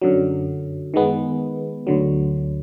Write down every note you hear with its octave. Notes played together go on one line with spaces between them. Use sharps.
F#2 D3 F#3
D#3 G#3 B3
D2 D3 F#3